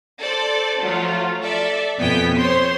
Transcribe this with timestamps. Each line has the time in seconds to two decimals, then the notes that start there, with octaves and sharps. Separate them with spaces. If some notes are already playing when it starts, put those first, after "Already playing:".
0.18 A4 C5 D5
0.80 F3 F#3 A3 F4
1.43 A4 D5 E5
1.97 F2 B2 B3 G5 G#5 B6
2.35 C5 C#5 C6